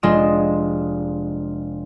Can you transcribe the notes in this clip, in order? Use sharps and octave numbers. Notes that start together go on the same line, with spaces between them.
F1 G#3 D4 F4 C6 E7